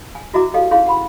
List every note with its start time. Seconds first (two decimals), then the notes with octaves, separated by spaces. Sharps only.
0.15 G#5
0.34 E4 F#4 D#5 E5 A#5 D6
0.54 G4 A4 D#5 F5 G5
0.71 C#4 D#4 E4 G#4 F5 C6
0.87 F#5 B5 C6